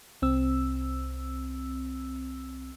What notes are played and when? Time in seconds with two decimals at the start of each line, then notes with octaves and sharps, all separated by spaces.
0.22 C2 C4 E6